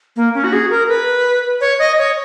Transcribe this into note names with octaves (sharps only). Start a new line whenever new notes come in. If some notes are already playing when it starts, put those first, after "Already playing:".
A#3
C#4
F#4
G#4
A#4
B4
C#5
D#5
C#5